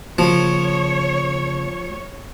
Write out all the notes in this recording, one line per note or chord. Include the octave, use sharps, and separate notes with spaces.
C#3 F3 A#3 C#5